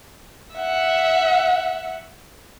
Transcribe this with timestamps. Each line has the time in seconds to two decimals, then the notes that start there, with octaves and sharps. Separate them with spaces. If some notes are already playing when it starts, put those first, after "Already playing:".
0.56 E5 F#5